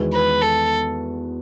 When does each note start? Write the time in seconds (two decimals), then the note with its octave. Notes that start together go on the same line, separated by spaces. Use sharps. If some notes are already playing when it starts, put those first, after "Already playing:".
Already playing: E2 D#3 G#3 B3 F#4
0.13 B4
0.41 A4